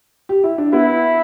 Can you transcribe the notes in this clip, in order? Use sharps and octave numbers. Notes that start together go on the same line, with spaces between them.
G4
E4
D4
B3 E4